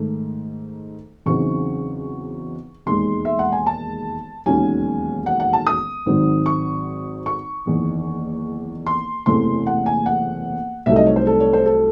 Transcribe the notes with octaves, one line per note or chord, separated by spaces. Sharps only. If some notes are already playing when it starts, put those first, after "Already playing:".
Already playing: G#2 D#3 A3 D#4
E2 C#3 F#3 C4 D#4 C#6
E1 D#2 D#3 G#3 C6
E5
F#5
G#5
A5
E1 D#2 D#3 F#3 C#4 G#5
F#5
F#5
A5
D#6
G#1 G#2 D#3 F#3 C4
C#6
C#6
F#1 E2 D#3
C6
F#1 E2 C3 E3 A3 C6
F#5
G#5
F#5
C2 C3 F#3 A3 D#4 E5
D#5
C#5
C5
A4
C#5
C5
A4